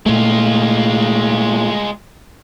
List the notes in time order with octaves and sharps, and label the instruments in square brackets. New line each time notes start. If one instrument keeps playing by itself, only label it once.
[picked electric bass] A#2 A3 [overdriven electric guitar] G#3 F4